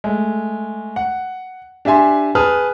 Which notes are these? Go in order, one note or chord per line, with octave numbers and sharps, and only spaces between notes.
G#3 A3
F#5
D4 G4 E5 G#5 C6
G#4 B4 A5 D#6 F6